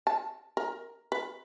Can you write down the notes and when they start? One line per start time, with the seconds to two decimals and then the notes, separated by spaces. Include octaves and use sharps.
0.07 A5
0.57 A#4
1.12 B4